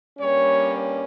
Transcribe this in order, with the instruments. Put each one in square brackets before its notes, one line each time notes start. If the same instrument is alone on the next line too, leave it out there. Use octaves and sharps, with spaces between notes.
[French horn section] G2 G3 A#3 C#4 C#5